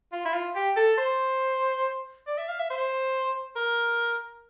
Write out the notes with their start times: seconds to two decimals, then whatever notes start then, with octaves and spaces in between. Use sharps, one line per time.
0.12 F4
0.25 E4
0.34 F4
0.55 G4
0.77 A4
0.98 C5
2.27 D5
2.38 E5
2.48 F5
2.59 E5
2.70 C5
3.56 A#4